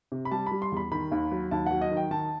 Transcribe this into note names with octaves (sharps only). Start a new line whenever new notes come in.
C3
B5
G3 A5
B5
G3
C6
E2 B5
D#3 B5
D#2
F#3
D#2 A5
F#3 F#5
D#5
D#3
G5
D#3 A5